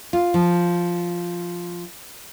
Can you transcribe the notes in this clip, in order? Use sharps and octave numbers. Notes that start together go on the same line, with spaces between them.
F4
F3